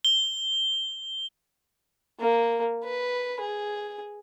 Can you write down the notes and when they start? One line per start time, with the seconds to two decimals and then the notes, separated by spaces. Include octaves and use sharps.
0.05 G7
2.20 A#3
2.84 B4
3.41 G#4